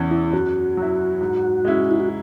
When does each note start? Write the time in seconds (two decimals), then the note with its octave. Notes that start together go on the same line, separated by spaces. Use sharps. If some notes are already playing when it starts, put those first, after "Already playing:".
Already playing: E2 E3 C#4
0.11 E4
0.33 F#2 F#4
0.77 F#3 E4
1.21 G#2
1.65 G#3 C#4 E4
1.91 E4
2.00 F#4